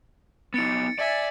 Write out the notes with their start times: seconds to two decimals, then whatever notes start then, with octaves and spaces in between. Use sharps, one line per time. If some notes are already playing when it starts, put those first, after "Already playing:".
0.54 B3 D#4 A6 C#7 D7
0.99 D5 E5 G#5